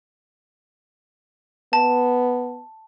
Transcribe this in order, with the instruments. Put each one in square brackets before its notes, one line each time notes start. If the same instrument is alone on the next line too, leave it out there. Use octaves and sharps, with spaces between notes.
[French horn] B3 [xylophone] A5